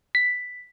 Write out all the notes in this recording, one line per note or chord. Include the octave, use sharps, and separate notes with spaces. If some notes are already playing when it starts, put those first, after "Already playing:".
B6